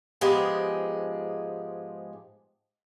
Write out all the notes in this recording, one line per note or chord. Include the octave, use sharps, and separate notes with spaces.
G#2 F3 G#3 B3 G4 G#4